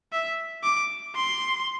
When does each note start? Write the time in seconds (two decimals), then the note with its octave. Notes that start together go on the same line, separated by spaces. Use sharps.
0.12 E5
0.63 D6
1.16 C6